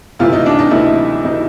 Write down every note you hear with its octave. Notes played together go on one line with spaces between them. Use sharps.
D2 C3 E3 F4
D#4
D4
D#4
D2 C3 E3 E4
C3 E3 D#4